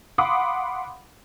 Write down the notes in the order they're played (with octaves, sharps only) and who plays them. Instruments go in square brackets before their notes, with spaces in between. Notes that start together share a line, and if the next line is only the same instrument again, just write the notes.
[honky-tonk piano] F5 F#5 B5 C6 D6 D#6